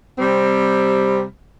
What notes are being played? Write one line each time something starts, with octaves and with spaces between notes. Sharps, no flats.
C3 G3 C4